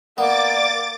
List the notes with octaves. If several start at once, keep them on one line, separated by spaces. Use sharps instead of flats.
A#3 B3 D5 D6 A6